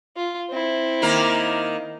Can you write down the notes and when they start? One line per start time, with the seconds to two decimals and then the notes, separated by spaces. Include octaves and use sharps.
0.16 F4
0.50 C4 E4
1.02 D#3 A#3 A#4